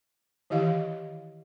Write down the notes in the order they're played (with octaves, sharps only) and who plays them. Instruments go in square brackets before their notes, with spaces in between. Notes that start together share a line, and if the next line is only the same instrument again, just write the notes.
[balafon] D#3 E3 E4 G4 D#5 F5